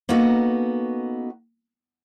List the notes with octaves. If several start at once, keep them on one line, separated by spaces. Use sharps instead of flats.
A#3 B3 C#4 D#4 F#4 A4